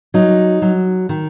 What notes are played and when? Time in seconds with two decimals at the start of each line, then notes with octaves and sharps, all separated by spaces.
0.14 F#3 D#4
0.62 F#3
1.09 D#3